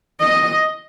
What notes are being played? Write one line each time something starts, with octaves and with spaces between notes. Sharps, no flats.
D#5